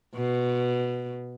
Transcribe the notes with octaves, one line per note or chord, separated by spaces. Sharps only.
B2